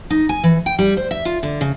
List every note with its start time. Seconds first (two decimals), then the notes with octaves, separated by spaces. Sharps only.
0.10 D#4
0.29 G#5
0.44 E3
0.66 G5
0.79 G3
0.97 C5
1.11 E5
1.25 F4
1.43 D3
1.61 C#3